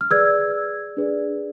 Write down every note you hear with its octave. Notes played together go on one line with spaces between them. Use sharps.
F6
G#4 B4 D5 E6 G#6
D4 G#4 B4 D5